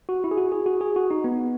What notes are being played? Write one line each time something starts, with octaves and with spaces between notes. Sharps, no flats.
F#4
E4
G#4
F#4
G#4
F#4
G#4
F#4
D#4
B3